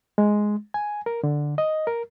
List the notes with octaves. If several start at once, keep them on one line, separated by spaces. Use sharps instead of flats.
G#3
G#5
A#4
D3
D#5
A#4